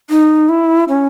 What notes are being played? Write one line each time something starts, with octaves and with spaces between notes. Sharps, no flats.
D#4
E4
C#4